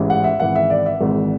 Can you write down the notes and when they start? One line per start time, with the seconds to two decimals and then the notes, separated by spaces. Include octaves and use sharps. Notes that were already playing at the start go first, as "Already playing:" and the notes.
Already playing: A1 G#2 E3
0.10 F#5
0.24 E5
0.40 G#1 G#2 E3 F#5
0.56 E5
0.70 D5
0.86 E5
1.01 G#1 G#2 E3